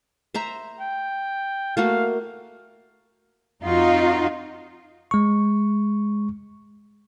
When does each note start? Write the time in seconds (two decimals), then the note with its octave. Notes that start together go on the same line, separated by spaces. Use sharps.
0.34 C5 E5 A#5
0.80 G5
1.77 A3 A#3 F#4 F5
3.63 F2 D#4 F4 F#4
5.11 G#3 C#6